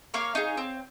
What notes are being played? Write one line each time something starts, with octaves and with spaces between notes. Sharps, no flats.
A#3 C#5 F5
D#4 G#4
C4